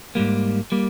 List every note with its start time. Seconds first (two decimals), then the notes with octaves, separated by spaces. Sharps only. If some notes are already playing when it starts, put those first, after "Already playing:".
0.15 G#2 G3 A#3
0.72 G3 A#3